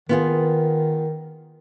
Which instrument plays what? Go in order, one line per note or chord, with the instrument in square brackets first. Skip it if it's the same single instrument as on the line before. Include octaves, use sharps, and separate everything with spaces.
[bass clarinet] D#3 [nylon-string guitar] B3 F4 G#4